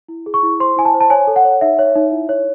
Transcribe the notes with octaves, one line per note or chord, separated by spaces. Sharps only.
E4
G#4
C#6
E4
C5 C6
E4 G#5
A5
C5
A5
C#5 G#5
A4
F#5
C#5
D#4 E5
C#5
D#4
E4
C#5